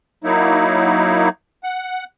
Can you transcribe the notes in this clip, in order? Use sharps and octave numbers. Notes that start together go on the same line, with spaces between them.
F#3 A#3 D#4 E4
F#5